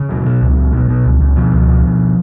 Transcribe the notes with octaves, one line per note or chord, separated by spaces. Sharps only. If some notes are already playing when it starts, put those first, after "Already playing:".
Already playing: C#3
B2 F#3
B2
C#2
C#2
B2
B2
C#2
C#2
B2 F3
C#2
B2
B2